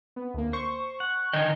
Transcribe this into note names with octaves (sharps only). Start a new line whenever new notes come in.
B3
D2 A#3
C5 C#6
F#5
D3 D#3 D#5 G5 G#5